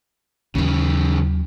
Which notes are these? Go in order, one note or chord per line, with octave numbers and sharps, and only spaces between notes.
D#2 C#3 E3 F#3